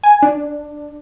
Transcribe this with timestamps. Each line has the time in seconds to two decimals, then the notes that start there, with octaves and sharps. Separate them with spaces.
0.03 G#5
0.23 D4